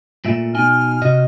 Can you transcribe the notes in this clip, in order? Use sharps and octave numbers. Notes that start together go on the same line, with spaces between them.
A#2 A3 E5
B2 D#4 G#5 F6
C3 F#4 D#5